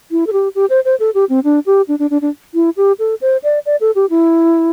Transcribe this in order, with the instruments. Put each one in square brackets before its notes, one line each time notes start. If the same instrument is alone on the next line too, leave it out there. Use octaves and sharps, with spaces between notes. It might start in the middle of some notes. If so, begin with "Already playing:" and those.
[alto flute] E4
A4
G4
G4
C5
C5
A4
G4
C4
D4
G4
D4
D4
D4
D4
E4
G4
A4
C5
D5
D5
A4
G4
E4